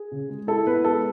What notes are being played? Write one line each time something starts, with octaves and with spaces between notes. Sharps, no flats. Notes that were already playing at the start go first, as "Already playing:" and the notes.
Already playing: G#4
C#3
G#3
E4 A4
B3 B4
G#3 A4